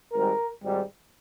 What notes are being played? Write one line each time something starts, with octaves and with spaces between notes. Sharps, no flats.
G#1 G#2 G3 A#4
G#1 G#2 G3